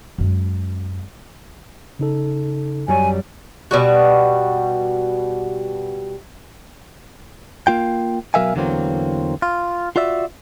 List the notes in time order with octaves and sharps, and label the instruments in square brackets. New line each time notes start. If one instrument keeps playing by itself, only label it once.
[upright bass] F#2 G#3
[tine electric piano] C#3 D#4 A4
[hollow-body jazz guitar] F#2 G3 C#5 [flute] G#5
[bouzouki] B2 G3 F#4
[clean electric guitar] A#3 F4 G5
B2 F#3 A#4 E5 F5 G#5
E2 D3 E3 F#3 A#3 C4
F4
F4 F#4 D5 E5